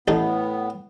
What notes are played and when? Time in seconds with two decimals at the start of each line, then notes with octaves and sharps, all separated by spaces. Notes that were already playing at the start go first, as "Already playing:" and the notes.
0.08 A1 A2 B3 D#4